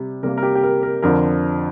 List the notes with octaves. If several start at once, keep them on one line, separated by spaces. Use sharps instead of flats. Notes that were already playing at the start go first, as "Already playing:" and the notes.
Already playing: C3 G3
C3 G3 A#3 A#4
A#4
G4
G4
A#4
A#4
F2 D3 F3 A#4